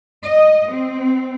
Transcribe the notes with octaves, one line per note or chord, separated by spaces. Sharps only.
D#5
C4